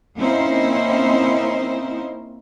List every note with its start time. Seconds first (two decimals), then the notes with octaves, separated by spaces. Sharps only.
0.17 A#3 C4 C#4 D#4 E4 C5